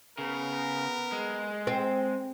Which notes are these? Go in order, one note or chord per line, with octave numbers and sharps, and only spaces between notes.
C#3 B3 A#4
G#3
C4